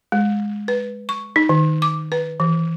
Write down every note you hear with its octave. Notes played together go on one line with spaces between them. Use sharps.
G#3
B4
C#6
D#4
D#3
D6
B4
E3